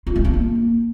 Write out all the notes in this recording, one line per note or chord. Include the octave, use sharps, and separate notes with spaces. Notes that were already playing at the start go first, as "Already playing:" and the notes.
F4
G#3
D4
A#3